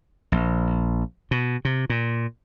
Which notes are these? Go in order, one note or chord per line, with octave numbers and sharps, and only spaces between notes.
A#1
B2
C3
A#2